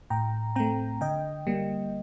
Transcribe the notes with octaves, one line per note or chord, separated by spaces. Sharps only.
A2 G5 A#5
A3 C4 G5 A#5
D3 D#5 G5
G3 A#3